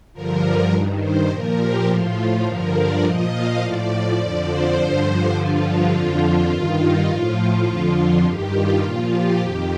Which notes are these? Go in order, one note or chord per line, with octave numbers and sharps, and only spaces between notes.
G2 D3 F3 A#4
G2 D#3
C5
A#2 F3 A#4
G4
A2 F3 F4
G2 D3 F3 A#4
D5
A#2 F3 D#5
F5
A2 F3 D5
F2 D3 F3
C5
G2 D3 F3
C5
G2 D3 F3 F4
F4
F2 D3 F3 F4
G2 D#3
D#4
A2 F3 F4
F4
F2 D3 F3
G2 D#3 G4
F4
A#2 F3 F4
G4
F2 D#3 G4